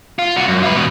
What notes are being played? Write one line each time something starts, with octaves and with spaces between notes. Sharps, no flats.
F4
C2 F#4
F#2
F4 B4
E2 B2